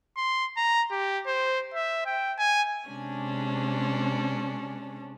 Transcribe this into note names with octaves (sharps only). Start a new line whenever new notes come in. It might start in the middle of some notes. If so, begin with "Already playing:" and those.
C6
A#5
G4
C5
E5
G5
G#5
C3 G#3 C#4 D4